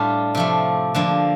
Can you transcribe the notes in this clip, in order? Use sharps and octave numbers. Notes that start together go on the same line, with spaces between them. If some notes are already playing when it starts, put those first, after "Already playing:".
Already playing: A2 G3 D4 F4
C3 F3 A3
D3 F3 A#3